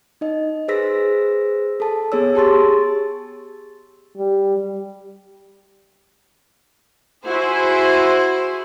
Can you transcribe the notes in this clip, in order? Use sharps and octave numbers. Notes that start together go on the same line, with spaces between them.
D#4 D#5
G#4 B4 C5 E6 A#6 B6
A4 A5
B3 G#4 C#5 E6
G4 G#4 A5 C6 C#6 A6
G3
E4 F#4 G#4 C5